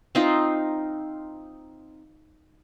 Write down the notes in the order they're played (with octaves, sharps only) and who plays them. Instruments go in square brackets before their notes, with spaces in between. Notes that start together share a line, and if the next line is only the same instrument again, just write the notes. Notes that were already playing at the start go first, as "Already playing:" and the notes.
[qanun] C4 D#4 F4